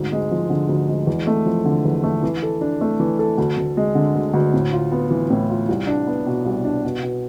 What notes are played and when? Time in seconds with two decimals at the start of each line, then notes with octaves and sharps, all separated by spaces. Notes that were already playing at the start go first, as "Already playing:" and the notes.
Already playing: D2 G#2
0.12 G#3
0.31 F3
0.50 D3
0.69 D2
0.88 G#3
1.07 E2
1.27 A3
1.46 F3
1.65 D3
1.85 E2
2.04 A3
2.23 E3
2.43 A4
2.61 D4
2.81 A3
3.00 E3
3.19 A4
3.38 D2
3.57 D2
3.77 G#3
3.95 D3
4.15 D2
4.34 D2
4.54 A2
4.72 F4
4.92 B3
5.11 E3
5.30 A2
5.50 F4
5.69 C2
5.87 D4
6.07 B3
6.26 B2
6.46 C2
6.65 D4
6.84 B2
7.03 B2